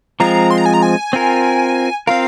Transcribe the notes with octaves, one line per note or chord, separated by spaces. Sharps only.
F3 G#3 C4 F4 A#5
C6
A#5
G#5
A#5
G#5
C4 F4 A#4
C4 F4 A#4 F5